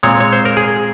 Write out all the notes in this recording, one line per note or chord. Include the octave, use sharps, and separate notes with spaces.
A#2 G#3 C4 C#5
C#5
C5
A#4
G#4